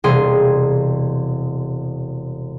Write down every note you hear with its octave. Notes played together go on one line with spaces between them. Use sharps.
E1 C3 G3 G#4 C6 D7